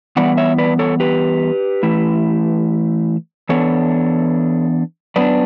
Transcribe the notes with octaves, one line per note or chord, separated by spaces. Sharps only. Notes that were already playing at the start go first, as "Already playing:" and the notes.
E3 G3 B3 D5 F#5
C#5 E5
B4 D5
A4 C#5
G4 B4
E3 A3 E4
E3 B3 D4 A4 C#5
F#3 B3 D4 B4 D5